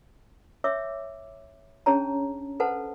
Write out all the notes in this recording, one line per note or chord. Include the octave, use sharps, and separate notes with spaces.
C#5 E5 D6 E6
C#4 D4 G#4 C#5 A5 A#5
A4 B4 C5 F#5 A5